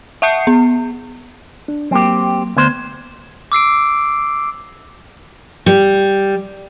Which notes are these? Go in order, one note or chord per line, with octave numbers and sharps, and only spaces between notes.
E5 F#5 A5 G6 C7 C#7
B3
D4
F#3 A#3 C4 G4
D2 B3 C5 G#6
D6 E6 C7 D7
G3